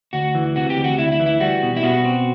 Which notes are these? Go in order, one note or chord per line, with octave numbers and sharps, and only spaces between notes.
D2 F#4
E3
C3 F#4
G4
D2
F#4
D2 E4
E4
E3
E4
G3 F#4
B2
E4
B2 F#4
C4